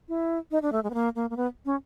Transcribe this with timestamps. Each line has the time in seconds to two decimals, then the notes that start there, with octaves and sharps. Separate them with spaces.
0.09 E4
0.51 D#4
0.62 D4
0.72 A3
0.84 G#3
0.90 B3
0.94 A#3
1.16 A#3
1.30 A#3
1.37 B3
1.66 C#4